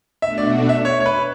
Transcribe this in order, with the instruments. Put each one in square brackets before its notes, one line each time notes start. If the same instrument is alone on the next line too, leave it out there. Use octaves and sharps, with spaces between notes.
[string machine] B2 A3 D4 F#4 [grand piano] E5
[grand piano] D5
E5
C#5
C#5
B4